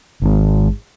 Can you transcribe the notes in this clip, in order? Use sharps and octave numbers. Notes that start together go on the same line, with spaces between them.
G#1 G#2